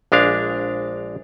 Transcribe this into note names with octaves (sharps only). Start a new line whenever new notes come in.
A#1 G#3 D4 F5